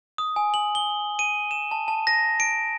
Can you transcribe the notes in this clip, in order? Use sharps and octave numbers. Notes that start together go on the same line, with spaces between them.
D#6
G#5
F#7
G7
D#7
E7
A5
A5
A#6
D7